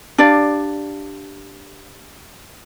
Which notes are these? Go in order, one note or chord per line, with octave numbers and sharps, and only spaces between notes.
D4 G4 D5 F5